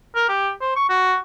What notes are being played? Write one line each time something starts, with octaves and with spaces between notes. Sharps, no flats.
A#4
G4
C5
C#6
F#4